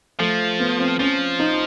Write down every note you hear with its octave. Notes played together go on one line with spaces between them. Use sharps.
F3 A3
B3
C4
F3 C#4
D#4